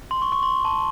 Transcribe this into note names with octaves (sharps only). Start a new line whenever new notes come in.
C6
C#6
C#6
C6
A5